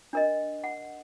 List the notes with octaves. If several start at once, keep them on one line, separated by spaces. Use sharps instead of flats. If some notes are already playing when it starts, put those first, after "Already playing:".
D4 A#4 D#5
F#5